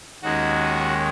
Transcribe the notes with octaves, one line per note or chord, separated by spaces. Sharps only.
D#2 D#3 G#3 C#4 F#4